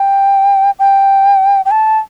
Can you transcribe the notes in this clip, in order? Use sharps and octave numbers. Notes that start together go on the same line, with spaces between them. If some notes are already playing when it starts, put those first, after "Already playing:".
Already playing: G5
G5
G5
A5